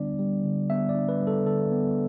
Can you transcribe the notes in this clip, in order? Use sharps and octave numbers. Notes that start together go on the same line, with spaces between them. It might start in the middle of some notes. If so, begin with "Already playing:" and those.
Already playing: D3 G3 B3 D4 D5
G3
D3
B3 E5
D5
D4
B4
G3
A4
D3 A4
B3